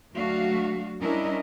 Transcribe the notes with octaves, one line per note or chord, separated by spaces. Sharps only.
D2 F#3 A3 D4 F#4 F5
G3 C#4 D4 E4 A#4 D#5